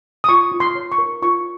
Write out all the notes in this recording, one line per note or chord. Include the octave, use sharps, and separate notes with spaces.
D#6
F4 C#6
F4
C6
C#5
C#6
A#4
F4 C#6